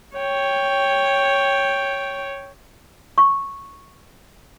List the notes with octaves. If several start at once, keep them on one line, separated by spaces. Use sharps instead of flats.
C#5 G5
C#6